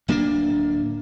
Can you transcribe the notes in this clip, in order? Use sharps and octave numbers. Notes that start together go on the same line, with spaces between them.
D1 A#3 C#4 D4